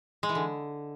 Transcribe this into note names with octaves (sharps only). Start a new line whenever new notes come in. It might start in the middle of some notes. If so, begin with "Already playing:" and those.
G#3
E3
D3